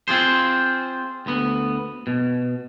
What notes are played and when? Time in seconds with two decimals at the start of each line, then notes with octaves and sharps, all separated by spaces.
0.08 C4 F4 G#4 C5
1.26 D2 B3
2.07 B2